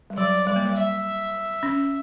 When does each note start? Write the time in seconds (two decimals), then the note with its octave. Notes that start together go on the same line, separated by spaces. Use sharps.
0.10 G3
0.18 F#3 D5
0.47 G3 D5
0.56 A#3
0.66 G3
0.76 E5
1.63 C#4